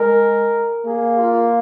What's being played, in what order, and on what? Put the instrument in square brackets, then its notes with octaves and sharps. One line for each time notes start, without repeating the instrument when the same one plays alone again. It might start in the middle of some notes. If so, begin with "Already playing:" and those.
Already playing: [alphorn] G#3 [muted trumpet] A#4
[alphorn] A#3 [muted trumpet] G#4
[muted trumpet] F4